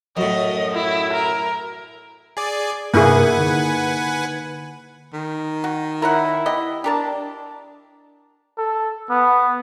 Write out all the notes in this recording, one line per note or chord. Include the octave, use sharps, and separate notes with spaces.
F#2 A2 D#5
E4
A#4
G#4 D5
G2 C3 A#3 E4 G#4 B4 F#5 G#5
D3 D#4
D#3
F#4
E4 A#4 C#5 F#5
B3 G4 D#5
D4 G4 A#4 A5
A4
B3